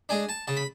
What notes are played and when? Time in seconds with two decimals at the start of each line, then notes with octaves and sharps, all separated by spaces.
0.09 G#3 D4 G#5
0.29 A5
0.47 C#3 A5
0.57 B5